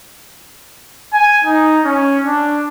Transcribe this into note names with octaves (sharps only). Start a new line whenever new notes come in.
G#5
D#4
C#4
D4